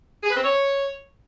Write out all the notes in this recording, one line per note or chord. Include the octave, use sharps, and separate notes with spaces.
G#4
B4
C4
C#5